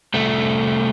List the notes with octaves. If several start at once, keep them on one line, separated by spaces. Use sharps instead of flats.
C2 A3